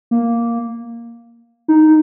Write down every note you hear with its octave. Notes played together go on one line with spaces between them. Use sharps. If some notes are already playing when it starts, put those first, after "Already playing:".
A#3
D#4